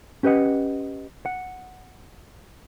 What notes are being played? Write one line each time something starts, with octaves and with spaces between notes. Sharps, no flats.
C#4 G4 B4 D#5 F#5
F#5